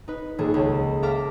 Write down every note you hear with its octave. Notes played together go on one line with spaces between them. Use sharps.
D#4 B4
D#1 A#3 G#4 A4
C#2
A4 E5 F5 A#5 D6 F6